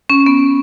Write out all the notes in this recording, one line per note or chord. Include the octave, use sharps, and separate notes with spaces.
C#4
B3